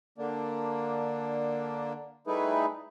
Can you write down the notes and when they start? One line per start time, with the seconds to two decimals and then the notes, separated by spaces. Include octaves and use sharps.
0.18 D3 A#3 D4
2.27 G3 A3 D#4 E4 G#4 B4